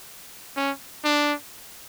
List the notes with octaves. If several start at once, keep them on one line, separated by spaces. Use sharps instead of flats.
C#4
D4